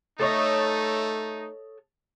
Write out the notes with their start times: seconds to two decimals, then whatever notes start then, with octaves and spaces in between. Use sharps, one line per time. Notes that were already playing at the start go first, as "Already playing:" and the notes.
0.20 A3 D#4 A4 C#5 D#5